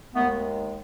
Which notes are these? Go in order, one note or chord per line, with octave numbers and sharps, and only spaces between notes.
D#2 D#3 G#3 A3 B3